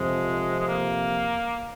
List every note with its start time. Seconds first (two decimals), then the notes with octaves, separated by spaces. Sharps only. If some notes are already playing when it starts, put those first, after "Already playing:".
Already playing: F2 C3 F3 G#3
0.60 G#3
0.67 A#3